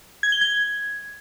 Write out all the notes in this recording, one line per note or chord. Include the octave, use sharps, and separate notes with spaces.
G#6
G7
G#6